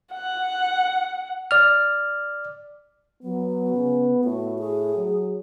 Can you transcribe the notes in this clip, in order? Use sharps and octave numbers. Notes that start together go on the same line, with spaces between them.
F#5
D5 F6
F#3 B3
C#3
A2 F#4
G#4
F#3